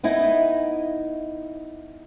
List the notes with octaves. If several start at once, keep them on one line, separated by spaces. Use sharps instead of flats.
B3 D#4 E4 G#5